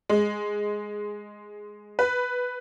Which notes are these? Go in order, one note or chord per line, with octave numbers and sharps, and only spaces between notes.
G#3
B4